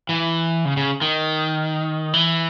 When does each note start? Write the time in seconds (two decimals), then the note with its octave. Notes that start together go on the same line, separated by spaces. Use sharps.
0.09 E3
0.65 C#3
0.77 C#3
1.01 D#3
2.13 E3